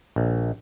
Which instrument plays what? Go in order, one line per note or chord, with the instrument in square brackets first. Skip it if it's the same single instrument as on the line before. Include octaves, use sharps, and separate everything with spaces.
[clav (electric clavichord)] A#1